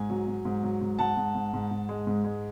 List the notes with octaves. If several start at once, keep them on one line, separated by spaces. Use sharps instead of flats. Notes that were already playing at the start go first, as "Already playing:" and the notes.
Already playing: G#2 G#5
F#3
F#3
G#2
F#3
G#2
G#2 F#5 A5
G#2
G#2
G#2
G#2
G#3
G#2
G#3